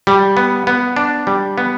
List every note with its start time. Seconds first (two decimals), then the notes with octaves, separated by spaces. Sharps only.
0.07 G3
0.37 B3
0.67 B3
0.96 D4
1.27 G3
1.58 B3